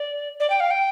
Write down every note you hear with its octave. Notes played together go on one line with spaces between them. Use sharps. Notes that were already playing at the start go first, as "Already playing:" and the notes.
Already playing: D5
D5
G5
F5
G5